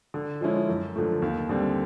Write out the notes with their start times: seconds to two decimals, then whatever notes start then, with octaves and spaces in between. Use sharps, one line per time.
0.14 D3
0.41 F3 G#3 C#4 E4
0.69 F#2
0.96 D3 F3 A3
1.22 D#2
1.49 D3 G3 C4